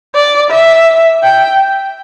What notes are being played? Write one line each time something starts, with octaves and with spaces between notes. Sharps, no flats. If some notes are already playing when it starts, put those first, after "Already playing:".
D5
E5
G5